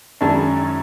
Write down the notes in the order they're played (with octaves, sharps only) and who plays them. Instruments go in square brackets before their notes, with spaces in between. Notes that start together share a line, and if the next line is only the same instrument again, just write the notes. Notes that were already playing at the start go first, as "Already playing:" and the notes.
[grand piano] F#2 D#3 G#3 C#4 E4 [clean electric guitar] D4